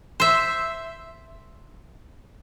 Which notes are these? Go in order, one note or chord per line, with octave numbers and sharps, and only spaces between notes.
C5 E5